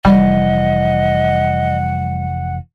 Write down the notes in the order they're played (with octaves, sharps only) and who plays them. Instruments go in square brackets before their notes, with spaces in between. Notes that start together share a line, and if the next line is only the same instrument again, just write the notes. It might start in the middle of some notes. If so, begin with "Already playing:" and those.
[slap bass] F1 E3 [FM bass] G3 [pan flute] D#5 [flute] F#5